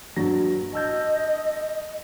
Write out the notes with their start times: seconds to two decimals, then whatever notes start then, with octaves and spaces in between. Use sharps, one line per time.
0.16 G2 F#3 A#6
0.73 D#5 A5 E6 G6